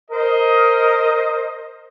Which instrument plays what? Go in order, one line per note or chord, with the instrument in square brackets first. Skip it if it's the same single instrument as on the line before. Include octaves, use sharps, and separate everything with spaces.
[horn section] A#4 C5 D#5